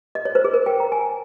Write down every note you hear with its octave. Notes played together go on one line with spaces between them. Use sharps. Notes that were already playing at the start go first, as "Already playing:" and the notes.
D#5
C#5
C5
G#4
A#4
G5
A#5
G#5